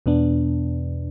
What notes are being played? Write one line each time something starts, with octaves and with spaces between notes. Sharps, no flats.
E2 B2 B3 D4